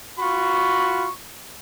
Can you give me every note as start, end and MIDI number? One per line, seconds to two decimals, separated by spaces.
0.19 1.08 65
0.19 1.08 66
0.19 1.08 83
0.19 1.08 85